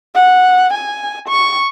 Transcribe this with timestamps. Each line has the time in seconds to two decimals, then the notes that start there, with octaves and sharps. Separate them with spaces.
0.15 F#5
0.74 G#5
1.29 C#6